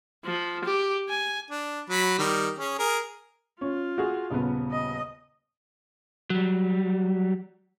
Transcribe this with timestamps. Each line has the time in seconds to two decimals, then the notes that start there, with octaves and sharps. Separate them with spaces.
0.25 F3
0.65 G4
1.09 G#5
1.50 D4
1.89 F#3 B5
2.18 D#3 G3
2.58 C#4 G#4
2.78 G#4 A#4
3.61 C#4 F4
3.98 F#4 G#4
4.30 D#1 C#3 B3
4.72 D#5
6.30 F#3 G3